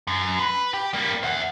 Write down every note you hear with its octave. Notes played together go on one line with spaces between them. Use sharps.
F#2
B4
G4
G3 A#3
E5 F#5